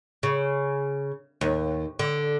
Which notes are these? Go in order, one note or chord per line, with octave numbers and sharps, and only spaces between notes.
C#3
D#2
D3